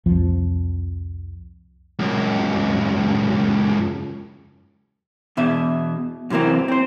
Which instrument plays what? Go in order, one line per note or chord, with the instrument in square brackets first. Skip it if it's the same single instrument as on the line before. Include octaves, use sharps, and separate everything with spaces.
[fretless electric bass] C2 F2 F3
[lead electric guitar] C#2 F#2
[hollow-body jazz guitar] E2 B2 E5
F#2 C3 E3 A#3 C4
C4 C5